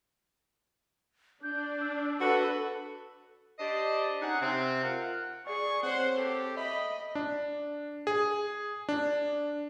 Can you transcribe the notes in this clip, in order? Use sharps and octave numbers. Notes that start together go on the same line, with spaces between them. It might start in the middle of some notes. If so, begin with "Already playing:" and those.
D4 G6
E6
F#4 A4 B4
D4 G4 C5 D5 D#5
C#4 D#4 G#4 F#5
C3 C4
F4 A#4 F#5
G#4 D5 C#6
C4 C5 C#5 F#5
G4 A4
D#5 E5 B5
D4
G#4
D4